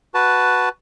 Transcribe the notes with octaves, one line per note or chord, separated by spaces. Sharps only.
F#4 B4 A5